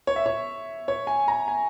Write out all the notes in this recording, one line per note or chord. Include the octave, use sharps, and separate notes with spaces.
C#5
E5
C#5
C#5
G#5
A#5
G#5